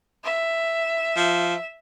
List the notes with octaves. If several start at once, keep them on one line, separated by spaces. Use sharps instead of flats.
E5
F3